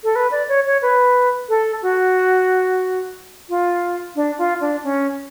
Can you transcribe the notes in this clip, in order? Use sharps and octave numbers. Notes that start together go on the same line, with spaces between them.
A4
B4
D5
C#5
C#5
B4
A4
F#4
F4
D4
F4
D4
C#4